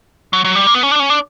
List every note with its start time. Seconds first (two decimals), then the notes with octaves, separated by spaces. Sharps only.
0.33 F#3
0.45 F#3
0.55 G3
0.67 A#3
0.75 B3
0.83 C#4
0.91 D4
0.99 C#4
1.10 D4